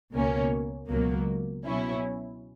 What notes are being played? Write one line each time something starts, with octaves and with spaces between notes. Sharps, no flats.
C#2 B2 A#3 C#4
C#2 B2 F#3 A#3
B2 F#3 C#4 E4